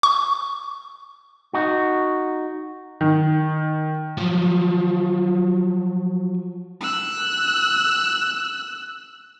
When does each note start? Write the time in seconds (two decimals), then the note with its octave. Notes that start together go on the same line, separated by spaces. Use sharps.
0.03 C#6
1.53 D#4 F#4
3.01 D#3
4.17 F3 F#3
6.81 E6 F#6